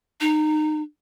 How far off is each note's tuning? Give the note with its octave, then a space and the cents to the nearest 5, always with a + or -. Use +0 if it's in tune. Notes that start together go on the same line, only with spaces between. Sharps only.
D#4 -20